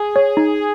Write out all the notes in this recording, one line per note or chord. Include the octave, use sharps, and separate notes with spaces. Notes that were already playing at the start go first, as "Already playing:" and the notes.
Already playing: G#4 G#5
C#5
D#4